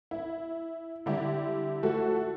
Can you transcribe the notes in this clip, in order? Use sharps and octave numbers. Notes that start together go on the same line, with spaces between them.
E4
D3 G3 E4 G4
F3 A3 E4 F#4 A4